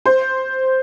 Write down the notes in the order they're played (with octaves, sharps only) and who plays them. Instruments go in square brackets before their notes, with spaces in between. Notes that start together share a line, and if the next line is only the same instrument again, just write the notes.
[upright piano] C5